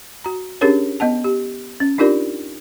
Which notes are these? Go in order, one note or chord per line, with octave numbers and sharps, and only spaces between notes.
F#4 A#5
C#4 D4 G4 G#4 A#4 C#5
B3 D#5 F#5 A5
G4
C#4
D4 D#4 F4 G4 A#4 D5